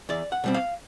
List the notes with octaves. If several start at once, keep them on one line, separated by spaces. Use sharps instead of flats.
E2 D5
F#5
B2 G3 C4
F5